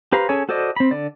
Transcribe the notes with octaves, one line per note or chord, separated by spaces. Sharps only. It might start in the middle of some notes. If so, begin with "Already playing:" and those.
G4 B4 C5 F5 A#5
C#4 G#4 A4 C#5 G#5
F#4 A4 C5 D5 D#5
C4 B5
D3 D5